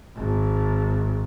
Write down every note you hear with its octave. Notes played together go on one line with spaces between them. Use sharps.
G#1